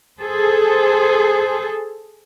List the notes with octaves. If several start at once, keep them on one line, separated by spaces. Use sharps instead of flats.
G#4 A4 C5